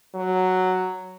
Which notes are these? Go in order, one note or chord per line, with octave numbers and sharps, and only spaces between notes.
F#3